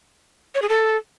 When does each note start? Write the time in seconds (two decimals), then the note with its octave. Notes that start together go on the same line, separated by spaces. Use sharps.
0.55 C#5
0.62 G#4
0.69 A4